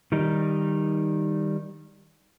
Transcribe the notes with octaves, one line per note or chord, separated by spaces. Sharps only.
D#3 G3 D#4